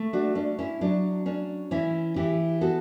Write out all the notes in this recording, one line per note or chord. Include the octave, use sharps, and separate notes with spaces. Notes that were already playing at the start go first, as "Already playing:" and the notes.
Already playing: A3
D4 F#4
C#4 D4
C#4 E4
F#3 D4
C#4 D4
E3 C#4 E4
E3 E4 G4
B3 F#4 A4